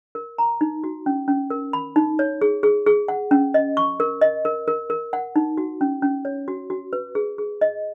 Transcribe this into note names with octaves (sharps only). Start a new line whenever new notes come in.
A#4
A#5
D#4
F#4
C#4
C#4
A#4
B5
D#4
C#5
G#4
G#4
G#4
F#5
C#4
D#5
C#6
A#4
D#5
A#4
A#4
A#4
F#5
D#4
F#4
C#4
C#4
C#5
F#4
F#4
B4
G#4
G#4
D#5